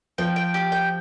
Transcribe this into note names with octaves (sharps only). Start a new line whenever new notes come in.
F3 G5
G5
G4
G5